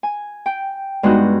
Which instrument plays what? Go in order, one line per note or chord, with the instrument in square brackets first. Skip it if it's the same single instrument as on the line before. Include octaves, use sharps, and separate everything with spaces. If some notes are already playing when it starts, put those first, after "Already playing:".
[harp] G#5
G5
G2 G#3 B3 D#4 F#4